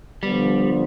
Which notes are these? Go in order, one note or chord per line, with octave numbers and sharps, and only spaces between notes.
D3 F3 G3 B3